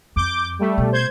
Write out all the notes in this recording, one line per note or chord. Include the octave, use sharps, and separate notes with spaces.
F2 D6 G6
G3 A3
B2
C5 G6 G#6